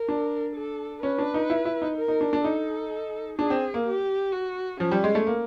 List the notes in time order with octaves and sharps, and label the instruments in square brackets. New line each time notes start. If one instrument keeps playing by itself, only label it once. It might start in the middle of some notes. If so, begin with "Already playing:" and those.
Already playing: [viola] A#4
[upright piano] D4
[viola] A4
[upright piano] C#4 [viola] B4
[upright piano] D4
D#4
E4
E4
D#4
[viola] A#4
[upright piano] D#4
D4
D4
[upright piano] D#4 [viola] A4
[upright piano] D4 [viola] G#4
[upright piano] C4
A#3
[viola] G4
F#4
[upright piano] F3 [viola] C#4
[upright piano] G3
G#3
A3
A#3